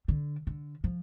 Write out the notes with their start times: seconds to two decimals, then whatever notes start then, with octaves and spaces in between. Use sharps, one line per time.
0.08 D3
0.47 D3
0.84 F3